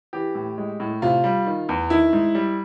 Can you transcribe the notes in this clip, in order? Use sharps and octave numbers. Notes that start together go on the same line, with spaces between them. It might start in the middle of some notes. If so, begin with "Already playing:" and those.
E3 G4
A2
G#3
A2
C3 F4
G3
D#3
E2
D#3 E4
G#2
G3